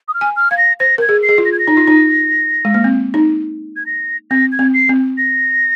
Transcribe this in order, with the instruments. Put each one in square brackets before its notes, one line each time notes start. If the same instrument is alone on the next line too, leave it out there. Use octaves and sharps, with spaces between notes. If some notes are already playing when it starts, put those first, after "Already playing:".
[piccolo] D#6
F6
[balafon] G#5
[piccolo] F6
[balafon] F5 [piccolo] G#6
[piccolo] A#6
[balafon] C5 [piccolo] A#6
[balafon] A#4 [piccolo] G#6
[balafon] G#4
[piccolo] C7
[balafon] G#4
F4
[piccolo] A#6
G#6
A#6
[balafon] D#4
F4
D#4
G#3
A#3
C4
D#4
[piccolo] G#6
A#6
[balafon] C4 [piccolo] A#6
[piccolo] G#6
[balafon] C4
[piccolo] C7
[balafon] C4
[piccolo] A#6